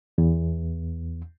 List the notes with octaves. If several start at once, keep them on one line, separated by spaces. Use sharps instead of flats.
E2